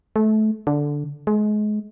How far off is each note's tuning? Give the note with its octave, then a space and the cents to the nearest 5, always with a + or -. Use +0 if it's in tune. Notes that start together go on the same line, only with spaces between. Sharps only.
A3 -25
D3 -5
G#3 +30